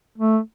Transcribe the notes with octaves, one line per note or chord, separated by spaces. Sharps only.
A3